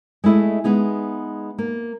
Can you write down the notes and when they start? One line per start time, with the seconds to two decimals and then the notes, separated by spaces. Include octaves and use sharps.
0.24 G#3 A3 E4 D#5
0.64 G#3 B3 D#4 G#4
1.58 A#3